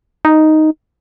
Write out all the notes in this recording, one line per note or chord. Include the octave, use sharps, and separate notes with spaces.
D#4